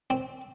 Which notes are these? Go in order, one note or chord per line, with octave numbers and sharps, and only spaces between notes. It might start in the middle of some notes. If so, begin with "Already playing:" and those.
C4